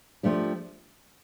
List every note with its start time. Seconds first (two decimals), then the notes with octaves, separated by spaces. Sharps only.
0.23 F3 A3 D4 G4